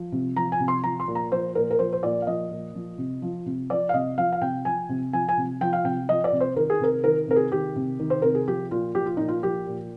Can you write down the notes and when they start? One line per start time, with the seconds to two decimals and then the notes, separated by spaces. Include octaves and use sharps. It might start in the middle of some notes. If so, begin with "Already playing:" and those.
Already playing: F3
0.12 C3
0.36 F3 A#5
0.52 G#5
0.60 C3
0.68 C6
0.84 F3 A#5
1.00 C6
1.08 A#2
1.15 A#5
1.32 F3 C5
1.55 A#2 A#4
1.71 A#4
1.79 F3 C5
1.93 C5
2.03 A#2 D5
2.22 F5
2.27 F3 D#5
2.51 A#2
2.75 F3
2.98 C3
3.22 F3
3.46 C3
3.70 F3 D5
3.89 F5
3.94 C3 D#5
4.18 F3 F5
4.32 F5
4.41 C3 G5
4.65 F3 G#5
4.89 C3
5.13 F3 G#5
5.29 G#5
5.37 C3
5.61 F3 G5
5.73 F5
5.84 C3 G5
6.09 F3 D#5
6.24 D5
6.32 C3
6.40 C5
6.56 D#3 A#4
6.70 G#4
6.80 C3 A#4
7.04 D#3 A#4
7.28 C3 A#4
7.36 G#4
7.52 D#3 G4
7.76 C3
8.00 D#3
8.10 C5
8.22 C3 A#4
8.35 G#4
8.47 F3 G4
8.71 A#2 F4
8.95 F3 G4
9.06 F4
9.17 A#2 D#4
9.28 F4
9.43 F3 G4
9.67 A#2